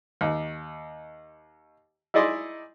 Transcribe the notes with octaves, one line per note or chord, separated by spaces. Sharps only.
D#2
D#4 E4 G#4 D5 D#5 C6